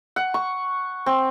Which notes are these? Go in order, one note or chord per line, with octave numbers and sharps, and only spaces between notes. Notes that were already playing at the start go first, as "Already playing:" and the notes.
F#5
C#6
C4